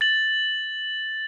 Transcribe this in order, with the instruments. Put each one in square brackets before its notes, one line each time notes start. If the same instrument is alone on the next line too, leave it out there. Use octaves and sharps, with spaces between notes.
[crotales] A6 F#7